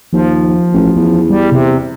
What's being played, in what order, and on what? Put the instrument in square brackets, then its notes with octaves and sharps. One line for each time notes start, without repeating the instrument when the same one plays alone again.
[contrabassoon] D#2 [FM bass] F3
[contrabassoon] A1
E2
[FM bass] G3
C3